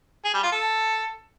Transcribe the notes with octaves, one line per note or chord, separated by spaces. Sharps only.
G#4
G3
F4
A4